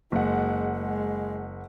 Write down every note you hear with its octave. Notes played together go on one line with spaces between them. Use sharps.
F#1 G#3 F#5
G#3